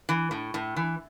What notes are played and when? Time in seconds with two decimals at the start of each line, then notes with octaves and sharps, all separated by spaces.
0.09 E3
0.31 A2
0.54 A2
0.77 E3